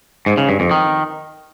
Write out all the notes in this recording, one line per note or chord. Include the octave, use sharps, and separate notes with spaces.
G#2
C#3
G2
F2
D#3